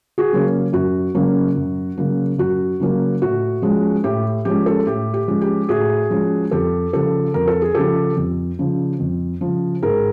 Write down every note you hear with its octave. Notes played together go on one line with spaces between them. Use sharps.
F#4 G#4
C#3 F#3 A#3 C#4
F#2 F#4
C#3 F#3 A#3 C#4
F#2
C#3 F#3 A#3 C#4
F#2 F#4
C#3 F#3 A#3 C#4
A2 F#4
F3 G#3 C#4
A2 G4
F3 G#3 C#4 G4
G4 A4
A2 G4
G4
F3 G#3 C#4
G4
A2 F#4 G#4
F3 G#3 C#4
F2 G4 A4
C#3 F3 G4 A4
F2 A#4
A4
G#4
C#3 F3 G4 A4
F2
C#3 F3
F2
C#3 F3
G#2 G#4 A#4